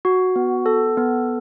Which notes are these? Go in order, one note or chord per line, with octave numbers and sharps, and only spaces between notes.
F#4
B3
A4
B3